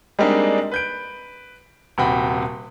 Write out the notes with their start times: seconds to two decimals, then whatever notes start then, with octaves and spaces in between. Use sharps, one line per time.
0.19 G3 G#3 A#3 C4 D4 D#4
0.71 B4 G6 D7
1.98 D#1 C3 F#4 G5 B5